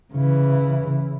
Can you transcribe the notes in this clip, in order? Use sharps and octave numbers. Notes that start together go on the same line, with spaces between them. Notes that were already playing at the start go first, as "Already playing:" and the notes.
C#3 E3